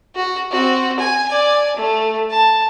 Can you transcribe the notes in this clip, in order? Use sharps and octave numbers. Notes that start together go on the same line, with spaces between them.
F#4
C4 F#4
G#5
D5 G#5
A3
A5